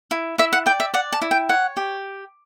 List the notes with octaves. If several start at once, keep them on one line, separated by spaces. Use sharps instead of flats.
E4
E4 E5
F#5
D5 G5
E5
D5 F#5
A5
E4
G5
C#5 F#5
G4